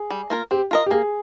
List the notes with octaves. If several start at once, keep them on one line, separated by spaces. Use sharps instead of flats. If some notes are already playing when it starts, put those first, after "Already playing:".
Already playing: G#4
G3
A#3 F4 A#4
C4 G4
F4 A#4 D#5
G4
A#3 G#4